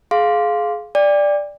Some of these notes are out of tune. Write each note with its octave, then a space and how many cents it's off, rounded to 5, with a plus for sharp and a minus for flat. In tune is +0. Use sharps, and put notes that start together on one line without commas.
G#4 +25 F5 +0 C6 +5
D5 +0 G5 +35